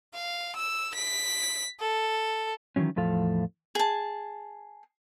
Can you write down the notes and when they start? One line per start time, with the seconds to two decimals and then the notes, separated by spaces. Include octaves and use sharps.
0.14 F5
0.56 E6
0.95 B6
1.80 A4
2.76 D#3 E3 F#3 C#4
2.96 E2 A2 F3 A4 F5
3.75 G#4 A5